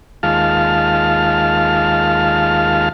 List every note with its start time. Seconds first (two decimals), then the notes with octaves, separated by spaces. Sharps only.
0.23 D#2 G#3 F4 F5 A5 F6